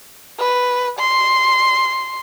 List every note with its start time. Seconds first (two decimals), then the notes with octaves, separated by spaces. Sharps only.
0.39 B4
0.99 C6